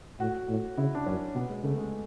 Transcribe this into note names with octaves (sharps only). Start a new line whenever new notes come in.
A2 F#4
A2
C#3 E4
D4
F#2 C#4
B2 B3
G#3
C#3 A3
G#3